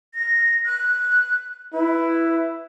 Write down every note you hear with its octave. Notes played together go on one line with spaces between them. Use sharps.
A#6
F#6
E4 B4